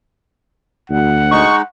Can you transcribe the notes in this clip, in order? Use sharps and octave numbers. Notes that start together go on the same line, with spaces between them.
D2 F#5
G#3 D#4 C#6